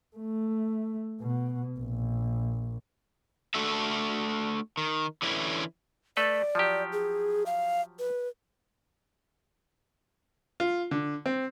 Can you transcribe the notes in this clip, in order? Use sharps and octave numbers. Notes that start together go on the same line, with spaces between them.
A3
B2
A#1
A3 D4 F#4 A4 E5
D#3
D3 E3 C#4 E4
A3 A4 B4 D5
F3 F#3 G4
G#4
F5
B4
F4
D3
C4